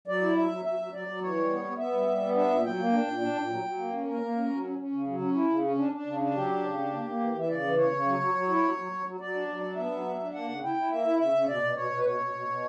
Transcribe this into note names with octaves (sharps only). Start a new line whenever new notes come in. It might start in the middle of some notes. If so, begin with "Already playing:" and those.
F#3 D5
E4
F#3 E5
F#3
F#3 E5
F#3
F#3 D5
F#3
E3 C#5
G3
B3
B3
B3 E5
G3
G3
B3
D4 E5
A#2
F#3 G5
A#3
D4
A#2
D4
A#2
F#3
F#3
A#3
C#4
A#3 A#4
A#3
C#4
F#3
C#4
C#4
C#3
F#3
C#4
E4
C#3
C#4
D4
D4
C#3
D4
F#3 G4
D4
C#3
D4
A#3
A#3
E3
E3 E5
C#3 D5
E3
C#3 C#5
C#3
F#3
F#3
F#3
E4
F#3
F#3
F#3
F#3
F#3 D5
D4
F#3
D4
B3 E5
F#3
D4
D4
A#3 F#5
C#3
E4 G5
E4
A#3 E5
E4
C#3 E5
C#3
B2 D5
B2
B2 C#5
B2
B4
B2 C#5
B2
B2
B2